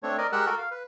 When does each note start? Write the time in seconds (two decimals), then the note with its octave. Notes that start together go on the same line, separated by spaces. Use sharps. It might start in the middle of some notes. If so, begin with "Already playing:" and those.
0.03 A3 C4 D4 C#5
0.18 A#4 D5 D#5
0.32 G#3 G4 A#4 F#5 E6 F#6
0.46 F#4 A4 A#4
0.58 F5
0.71 B4